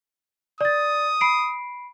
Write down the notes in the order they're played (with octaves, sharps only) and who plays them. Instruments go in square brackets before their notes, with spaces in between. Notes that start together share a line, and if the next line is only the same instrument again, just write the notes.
[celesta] D5 A6 [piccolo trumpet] D#6
[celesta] B5 C7 D7